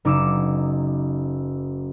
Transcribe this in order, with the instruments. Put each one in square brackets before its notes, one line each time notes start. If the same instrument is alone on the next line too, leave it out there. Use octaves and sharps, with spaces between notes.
[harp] F#1 D#4 D6 E6 C#7 E7